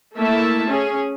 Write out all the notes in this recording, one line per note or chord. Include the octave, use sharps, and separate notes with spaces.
A3 A#3 E4 E5 A5
C#4 G#4